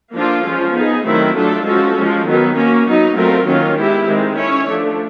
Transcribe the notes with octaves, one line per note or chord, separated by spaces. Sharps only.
F3 A#3 D4 F4 A4
F3 G#3 C#4
B3 D#4 G#4
D#3 F#3 A3 C4 E4
F#3 A3 D4 F4 A4
F3 G#3 C#4 F#4 A4
F3 G#3 C#4
D#3 F#3 B3
A#3 C#4 F#4
F#3 B3 D#4
F#3 A3 C4 F4 A#4
D#3 F#3 A#3 C#4 F4
G#3 B3 E4 G4
D#3 G#3 C4
C#4 E4 A4 C#5
F3 A3 D4